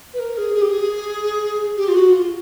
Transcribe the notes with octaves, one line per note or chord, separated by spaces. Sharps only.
B4
A#4
G#4
G#4
G4
G#4
G4
F4
F#4
F4